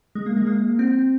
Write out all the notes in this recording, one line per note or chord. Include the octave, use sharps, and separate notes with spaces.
G#3
A#3
G#3
A#3
C4